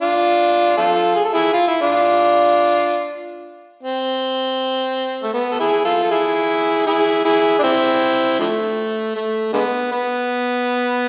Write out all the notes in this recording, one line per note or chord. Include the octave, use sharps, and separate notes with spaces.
D4 F4
F4 A4
G#4
A4
E4 G#4
F4
E4
D4 F4
C4
A3
B3
A4
E4 G#4
F4 A4
A4
E4 G#4
E4 G#4
E4 G#4
D4
C4 E4
D3 F3 A3
A3
D3 G#3 B3
B3